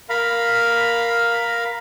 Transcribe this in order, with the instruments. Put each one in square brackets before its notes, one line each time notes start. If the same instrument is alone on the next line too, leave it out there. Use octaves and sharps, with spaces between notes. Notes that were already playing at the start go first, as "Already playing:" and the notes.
[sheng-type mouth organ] A#4 F5 B5